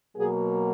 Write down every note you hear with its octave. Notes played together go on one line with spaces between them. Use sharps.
B2 F#3 A#3 G#4